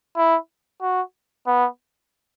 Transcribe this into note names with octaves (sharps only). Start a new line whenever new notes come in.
E4
F#4
B3